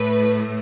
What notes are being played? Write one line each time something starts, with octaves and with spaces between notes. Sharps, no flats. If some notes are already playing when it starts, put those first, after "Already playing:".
Already playing: A2 A3 B4